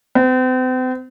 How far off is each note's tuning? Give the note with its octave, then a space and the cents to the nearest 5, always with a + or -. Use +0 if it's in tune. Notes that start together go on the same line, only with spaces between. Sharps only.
C4 -40